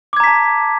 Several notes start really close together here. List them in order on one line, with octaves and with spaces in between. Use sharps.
D6 G#6 A#5 B6 A5